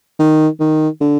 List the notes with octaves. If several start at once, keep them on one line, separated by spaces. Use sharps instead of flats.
D#3
D#3
D3